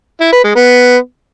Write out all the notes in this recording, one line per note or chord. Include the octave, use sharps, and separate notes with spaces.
E4
B4
G#3
B3